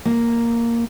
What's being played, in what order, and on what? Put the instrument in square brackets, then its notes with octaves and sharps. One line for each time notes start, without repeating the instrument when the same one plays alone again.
[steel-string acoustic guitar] A#3